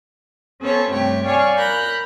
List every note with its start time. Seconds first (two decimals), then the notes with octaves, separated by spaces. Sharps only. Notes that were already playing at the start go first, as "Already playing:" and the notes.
0.61 B3 C#4 A4 C5 C#5
0.91 G2 C3 A3 C#5 G5
1.25 C#5 D5 F5 G#5 C#6
1.57 A#4 A#5 B5 F#6 G6